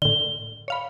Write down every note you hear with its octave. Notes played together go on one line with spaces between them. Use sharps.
A2 D3 G7
C#5 F5 B5